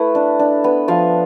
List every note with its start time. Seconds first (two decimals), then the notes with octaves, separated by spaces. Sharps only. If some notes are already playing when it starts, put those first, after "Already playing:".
Already playing: A3 E4 B4
0.15 D4
0.39 D4
0.64 B3
0.88 F3 F5